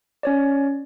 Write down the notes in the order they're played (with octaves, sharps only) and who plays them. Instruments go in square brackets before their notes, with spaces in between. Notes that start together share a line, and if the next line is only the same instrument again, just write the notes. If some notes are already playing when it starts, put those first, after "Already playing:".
[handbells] C#4 C#5 D5